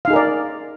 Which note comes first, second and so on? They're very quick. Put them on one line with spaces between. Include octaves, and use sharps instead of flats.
F5 D#4 G#4 A#4 D5